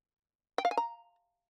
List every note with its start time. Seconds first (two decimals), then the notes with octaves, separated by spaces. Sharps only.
0.58 G5
0.65 F5
0.71 G#5
0.77 A#5